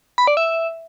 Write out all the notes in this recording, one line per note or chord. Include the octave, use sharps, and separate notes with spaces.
B5
D5
E5